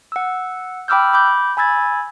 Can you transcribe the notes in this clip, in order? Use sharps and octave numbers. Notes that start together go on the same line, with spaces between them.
F#5 E6
G5 B5 D6 E6 F6 G6
B5 D6 G6
G#5 B5 E6 G#6 A6